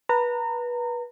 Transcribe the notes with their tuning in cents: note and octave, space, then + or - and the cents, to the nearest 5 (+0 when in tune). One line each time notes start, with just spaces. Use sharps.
B4 -25 A#5 -30